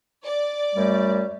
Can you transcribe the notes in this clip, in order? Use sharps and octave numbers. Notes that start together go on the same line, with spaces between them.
D5
F#2 G3 A3